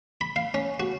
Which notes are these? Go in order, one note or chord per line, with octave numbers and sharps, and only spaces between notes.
B5
F5
C#4
F#4